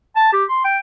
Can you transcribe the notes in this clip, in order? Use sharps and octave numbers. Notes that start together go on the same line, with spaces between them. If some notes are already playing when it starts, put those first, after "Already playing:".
A5
G4
C6
G5